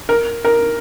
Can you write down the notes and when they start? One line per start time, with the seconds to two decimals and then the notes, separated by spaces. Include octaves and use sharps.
0.09 A#4
0.45 A#4